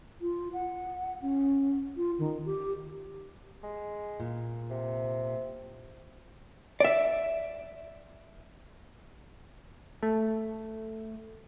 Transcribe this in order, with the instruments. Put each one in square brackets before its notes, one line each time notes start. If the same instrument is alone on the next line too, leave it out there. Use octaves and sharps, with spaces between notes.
[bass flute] F4
F#5
C#4
F4
D#3
G4
[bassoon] G#3
[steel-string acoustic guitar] A#2
[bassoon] C3
[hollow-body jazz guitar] D5 E5
[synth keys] A3